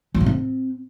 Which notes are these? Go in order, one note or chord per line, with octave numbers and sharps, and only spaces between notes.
F#3
A2
C4